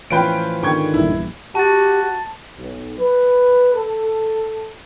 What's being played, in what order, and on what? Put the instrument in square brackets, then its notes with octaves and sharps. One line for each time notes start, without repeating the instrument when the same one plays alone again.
[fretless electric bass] A2 E3 F3 [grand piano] C#4 F4 B4 [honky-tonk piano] G5 D7
[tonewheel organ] G#2 D3 D#3 [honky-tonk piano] G5 C#6 G#6
[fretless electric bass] A#1 E2 G2 [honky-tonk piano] E4
[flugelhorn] F#4 [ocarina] G4 [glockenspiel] A5 A6
[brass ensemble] B1
B4
A4